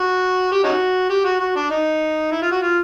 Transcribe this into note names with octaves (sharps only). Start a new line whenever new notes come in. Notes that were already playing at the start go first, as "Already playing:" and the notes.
Already playing: F#4
G4
C#4 D#4 F#4
G4
F#4
F#4
D4
D#4
E4
F4
F#4
F4